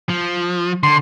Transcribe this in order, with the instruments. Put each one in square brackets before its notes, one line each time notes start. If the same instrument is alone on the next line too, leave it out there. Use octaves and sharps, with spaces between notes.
[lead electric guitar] F3
[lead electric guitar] D3 [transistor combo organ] C6